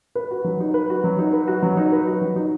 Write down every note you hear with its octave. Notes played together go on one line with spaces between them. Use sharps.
B4
F#4
F#3
D#4
B4
F#4
F#3
D#4
B4
F#4
F#3
D#4
B4
F#4
F#3
D#4